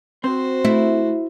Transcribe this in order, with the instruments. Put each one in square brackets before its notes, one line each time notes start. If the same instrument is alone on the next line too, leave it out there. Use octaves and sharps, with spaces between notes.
[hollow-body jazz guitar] C4 [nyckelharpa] F#4 C5
[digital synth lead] A3 [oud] E4